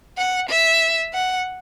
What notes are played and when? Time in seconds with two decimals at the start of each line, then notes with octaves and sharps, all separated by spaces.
0.17 F#5
0.49 E5
1.14 F#5